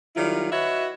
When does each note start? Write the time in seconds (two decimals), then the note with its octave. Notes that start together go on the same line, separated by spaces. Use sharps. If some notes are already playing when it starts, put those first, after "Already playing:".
0.16 D#3 F#3 G3 E4 F4
0.52 F#4 B4 C#5 D#5 E5